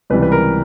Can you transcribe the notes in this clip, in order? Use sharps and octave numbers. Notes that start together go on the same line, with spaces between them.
C#2 C3 E3 G3 B4
B4
A#4